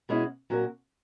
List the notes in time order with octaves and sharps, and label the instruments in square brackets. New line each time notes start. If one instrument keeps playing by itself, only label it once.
[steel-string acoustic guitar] B2 G#3 C#4 E4
A#2 F#3 C#4 F#4 A#4